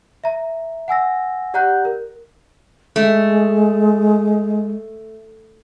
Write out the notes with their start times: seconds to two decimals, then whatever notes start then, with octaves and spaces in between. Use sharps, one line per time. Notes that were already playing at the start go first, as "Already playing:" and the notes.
0.24 E5 A#5
0.88 F#5 G#5 E6 A#6
1.54 G4 D5 F#5 A#5 F#6 G6
1.85 A#4
2.96 G#3 A3